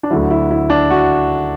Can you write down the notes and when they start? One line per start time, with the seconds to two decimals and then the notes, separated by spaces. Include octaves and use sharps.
0.03 D4
0.10 D2 D3 F#3 E4
0.30 E4
0.51 E4
0.70 D4
0.90 F#4